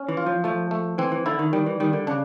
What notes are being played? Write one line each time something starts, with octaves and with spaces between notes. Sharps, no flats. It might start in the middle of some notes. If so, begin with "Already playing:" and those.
Already playing: C#4
E3
F4
F3
F3 A3
A3
E3 C4
E3
D3 E4
D#3
D#3 G3
E3
D#3 G3
D3
C#3 D4